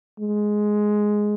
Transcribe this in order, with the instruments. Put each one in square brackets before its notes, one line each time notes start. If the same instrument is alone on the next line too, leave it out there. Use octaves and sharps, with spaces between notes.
[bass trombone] G#3